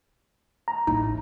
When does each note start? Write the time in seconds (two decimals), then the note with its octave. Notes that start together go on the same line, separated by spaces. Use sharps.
0.68 A#5
0.87 A1 D#4 E4